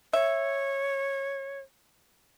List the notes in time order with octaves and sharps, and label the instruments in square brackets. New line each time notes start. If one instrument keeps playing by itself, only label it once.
[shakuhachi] C#5 [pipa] E5